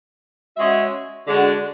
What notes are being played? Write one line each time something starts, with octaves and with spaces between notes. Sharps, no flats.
G#3 C#4 F#4 C#5 E5
D3 G#3 D4 F#4